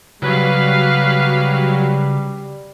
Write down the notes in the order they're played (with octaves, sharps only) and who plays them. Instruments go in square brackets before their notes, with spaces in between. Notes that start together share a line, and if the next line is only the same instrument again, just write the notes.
[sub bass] C#3 [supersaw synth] F#3 [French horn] G3 [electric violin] B4 F5